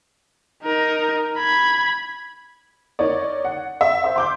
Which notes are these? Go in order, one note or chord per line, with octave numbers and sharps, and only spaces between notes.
D#4 A#4
B5 G#6
D#4 A#4 C#5 D5
F#5
E5
C5 E5
C6 D6 G6